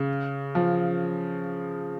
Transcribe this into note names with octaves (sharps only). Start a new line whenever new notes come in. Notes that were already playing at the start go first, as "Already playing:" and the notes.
Already playing: C#3
F3